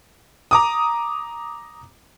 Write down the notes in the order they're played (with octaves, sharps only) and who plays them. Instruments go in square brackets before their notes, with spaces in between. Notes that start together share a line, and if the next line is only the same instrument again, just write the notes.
[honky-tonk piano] A#5 D6 D#6